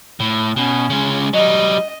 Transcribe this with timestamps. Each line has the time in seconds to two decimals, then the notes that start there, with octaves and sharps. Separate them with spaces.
0.20 A2
0.56 B2 C#4
0.90 C#3 G#3
1.34 F#3 G3 D#5